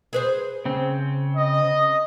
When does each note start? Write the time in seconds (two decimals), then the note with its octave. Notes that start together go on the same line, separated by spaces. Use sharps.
0.13 G#4 B4 C5
0.65 C#3 C4
1.37 D#5